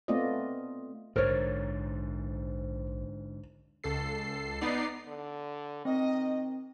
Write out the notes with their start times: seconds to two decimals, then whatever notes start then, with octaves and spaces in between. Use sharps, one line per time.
0.08 A3 B3 C4 F4 D5 D#5
1.16 A#1 G#2 D3 A#4 C5 C#5
3.84 C#2 A4 C7
4.61 B3 D#4 D5 C7
5.08 D3
5.85 D#3 C4 D#5